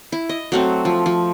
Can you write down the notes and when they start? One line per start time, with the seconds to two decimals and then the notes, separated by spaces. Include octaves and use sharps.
0.12 E4
0.29 D#5
0.52 F#3 A3 C4
0.85 F3
1.06 F3